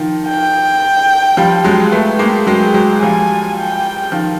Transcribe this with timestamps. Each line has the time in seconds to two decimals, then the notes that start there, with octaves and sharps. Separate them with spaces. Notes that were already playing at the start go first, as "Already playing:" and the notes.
Already playing: D#3 F3
0.28 G5
1.37 F3 G3
1.64 F#3 G#3
1.92 A3 B3 G5
2.19 G#3 A#3
2.47 F#3 G#3 G5
2.74 F#3 G#3
3.02 F3 G3 G#5
3.57 G5
4.12 D#3 F3